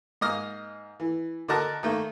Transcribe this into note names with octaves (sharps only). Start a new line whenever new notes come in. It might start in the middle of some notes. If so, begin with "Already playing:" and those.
G#2 A#3 D#5 D#6 F6
E3
D3 F#4 A#4 D#5 A5 F#6
D#3 A3 A#3